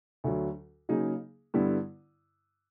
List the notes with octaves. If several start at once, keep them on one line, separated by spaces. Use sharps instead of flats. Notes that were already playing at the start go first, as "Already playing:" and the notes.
D2 D3 F#3
C#3 F#3 A#3 D#4 G#4
G2 D3 G3 B3 E4